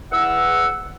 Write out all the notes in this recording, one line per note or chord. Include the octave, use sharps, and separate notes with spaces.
E2 F#5 E6